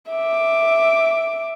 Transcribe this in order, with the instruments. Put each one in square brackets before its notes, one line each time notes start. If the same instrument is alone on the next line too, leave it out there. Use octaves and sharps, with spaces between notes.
[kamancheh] E5 D6